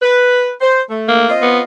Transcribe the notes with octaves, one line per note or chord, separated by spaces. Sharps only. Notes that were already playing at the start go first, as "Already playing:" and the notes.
B4
C5
A3
A#3
C4 F4 D#5
B3